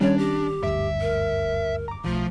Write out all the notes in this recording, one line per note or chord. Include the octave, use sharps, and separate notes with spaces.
D#3 G3 C#4 D4 C#5
G4 A#6
F#1 D2 G2 E5 D7
A#4
A#5 D6
B1 F3 A3